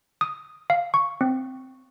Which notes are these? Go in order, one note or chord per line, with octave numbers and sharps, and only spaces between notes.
D#6
F5
C#6
C4